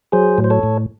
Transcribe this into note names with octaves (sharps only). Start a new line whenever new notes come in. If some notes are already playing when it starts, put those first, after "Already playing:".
F#3 G#4 C5
A2
C5
A4 C#5
A2